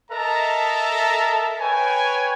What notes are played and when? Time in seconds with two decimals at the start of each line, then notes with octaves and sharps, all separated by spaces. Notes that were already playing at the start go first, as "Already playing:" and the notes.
0.11 A4 A#4 D#5 E5 A5 A#5
1.60 B4 C#5 G5 G#5